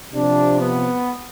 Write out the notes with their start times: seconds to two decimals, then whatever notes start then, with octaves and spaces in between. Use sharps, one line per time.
0.13 C3 F3 D4
0.61 B3